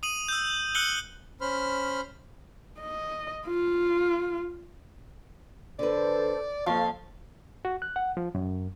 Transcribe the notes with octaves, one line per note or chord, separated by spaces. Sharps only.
D#6 D#7 F#7
E6 G6
E6 F#6 C#7 D#7 F#7 G7
C#4 C5 B5 F6
D#5
F4
D3 A4 B4 C5 D5
F2 F3 A#3 C4 A4 F5 C#6
F#4
F#6
F#5
F3
F#2